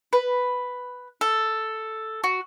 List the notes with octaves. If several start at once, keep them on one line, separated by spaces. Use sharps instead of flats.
B4
A4
F#4